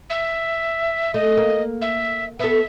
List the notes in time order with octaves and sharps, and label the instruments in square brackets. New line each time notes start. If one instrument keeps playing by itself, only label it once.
[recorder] E5
[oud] A3 [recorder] D#5
[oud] A#3
[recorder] E5
[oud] B3 A4 [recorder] E5